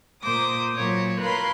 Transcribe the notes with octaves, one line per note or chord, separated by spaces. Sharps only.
A#2 A#3 C5 D6 D#6
A#2 F#3 C#5
A#4 B4 F5 B5 C6